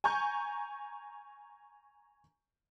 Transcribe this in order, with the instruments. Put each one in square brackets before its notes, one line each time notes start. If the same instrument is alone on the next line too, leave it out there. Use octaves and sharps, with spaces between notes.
[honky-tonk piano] G#5 A#5 C#6 G6